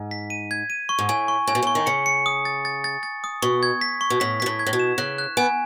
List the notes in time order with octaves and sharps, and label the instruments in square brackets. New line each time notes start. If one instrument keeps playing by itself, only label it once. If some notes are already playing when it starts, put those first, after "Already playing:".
Already playing: [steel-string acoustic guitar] G#2
[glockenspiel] B6
D#7
G#6
D#7
C#6
[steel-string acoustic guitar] G#2
[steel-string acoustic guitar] A2 [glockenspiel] G#5
[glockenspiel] C#6
[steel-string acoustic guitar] A2 [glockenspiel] G#5
[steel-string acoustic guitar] B2
[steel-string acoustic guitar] A2 [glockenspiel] C#6
[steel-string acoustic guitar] D#3
[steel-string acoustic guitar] C#3 [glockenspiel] C#7
[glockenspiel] C#7
D#6
A6
A6
A6
A6
D#6
[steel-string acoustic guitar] B2 [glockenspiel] C#6
[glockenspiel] G#6
B6
C#6
[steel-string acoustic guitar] B2
[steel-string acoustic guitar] A2 [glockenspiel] B6
[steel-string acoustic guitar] B2 [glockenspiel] B6
[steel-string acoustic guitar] A2
[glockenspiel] G#6
[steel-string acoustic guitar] A2
B2
[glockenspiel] E7
[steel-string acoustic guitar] C#3 [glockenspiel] F#6
[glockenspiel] F#6
[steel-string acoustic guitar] B3 [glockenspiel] G#5